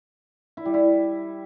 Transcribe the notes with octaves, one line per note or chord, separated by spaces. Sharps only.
E4
G3
E4